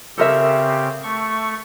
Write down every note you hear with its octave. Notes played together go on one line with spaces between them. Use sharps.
C#3 C4 G4 A4 A#4 E5
A3 C#6